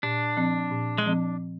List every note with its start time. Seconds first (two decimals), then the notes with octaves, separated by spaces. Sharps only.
0.03 A#2 D4
0.37 F3 C4
0.71 A#2
0.98 G#3
1.06 F3 C4